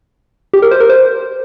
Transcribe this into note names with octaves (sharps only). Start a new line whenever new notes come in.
G4
A#4
C5
A#4
C5